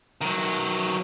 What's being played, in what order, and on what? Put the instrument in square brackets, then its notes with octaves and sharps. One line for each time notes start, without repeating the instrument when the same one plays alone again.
[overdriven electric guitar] D#3 F#3